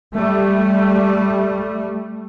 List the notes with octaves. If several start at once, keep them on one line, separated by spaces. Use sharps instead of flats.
G3 A3